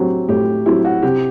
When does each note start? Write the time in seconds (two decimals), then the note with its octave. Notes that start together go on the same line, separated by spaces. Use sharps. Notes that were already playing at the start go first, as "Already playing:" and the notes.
Already playing: A2 F#3 C4 G4
0.29 A2 G4
0.66 F#3 C4 E4 G4
0.84 F#4
1.02 C3 G4